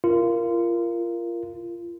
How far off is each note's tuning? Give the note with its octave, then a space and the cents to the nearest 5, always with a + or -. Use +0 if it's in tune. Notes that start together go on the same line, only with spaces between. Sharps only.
F4 -25 A#4 +0